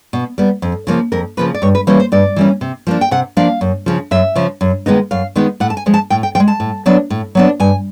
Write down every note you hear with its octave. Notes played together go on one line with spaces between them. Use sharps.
B2
G3 B3
F2
C#3 F3 A#3
F2 A#4
C#3 F3 A#3 B4
D5
G2 C#5
B4
E3 G3 A#3 C#4 C5
C5
G2 D5
E3 G3 A#3 C#4
C3
F3 A#3 D4
G5
C3 F#5
F3 A#3 D4 F5
F#2
C#3 F3
F#2 E5
C#3 F3
F#2
D#3 G#3 B3 D#4
F#2 F5
D#3 G#3 B3 D#4
A2 F#5
A5
G#5
F3 G#3
A5
A2 G5
G5
F3 G5
G#3
A5
A2
F#3 B3 D4
A2
F#3 B3 D4
G2 G#5